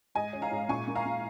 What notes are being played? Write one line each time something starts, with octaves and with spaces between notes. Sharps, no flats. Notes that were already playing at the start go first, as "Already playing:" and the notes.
G#2 D#5 G#5
C#4
F5 A#5
G#2
A#2 G#5 C#6
A#3
F5 A#5
A#2